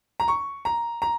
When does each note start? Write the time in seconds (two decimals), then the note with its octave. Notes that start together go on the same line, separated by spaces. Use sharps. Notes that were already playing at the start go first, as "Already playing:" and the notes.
0.20 A#5
0.28 C#6
0.65 A#5
1.02 A#5